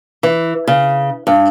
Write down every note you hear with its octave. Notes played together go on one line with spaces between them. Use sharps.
E3
C#3
G2